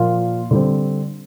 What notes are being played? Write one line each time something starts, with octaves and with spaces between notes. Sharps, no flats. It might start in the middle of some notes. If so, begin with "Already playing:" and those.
Already playing: A#2 F3 A#3 F4 F5
D3 G3 C4